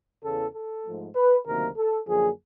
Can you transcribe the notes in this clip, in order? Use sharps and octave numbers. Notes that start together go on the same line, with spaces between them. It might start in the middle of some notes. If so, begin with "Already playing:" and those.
E2 C#3 E3 A4
A4
G#2 F3 A3
B4
D2 C3 D#3 F#3 A#3 A#4
A4
F#2 D3 F3 A#3 G#4